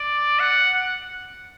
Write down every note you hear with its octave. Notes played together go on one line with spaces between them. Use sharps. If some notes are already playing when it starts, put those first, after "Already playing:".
Already playing: D5
F#5